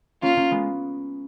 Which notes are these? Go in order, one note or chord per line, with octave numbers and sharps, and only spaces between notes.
A#3 C#4 F4
A#3 C#4
G#3 B3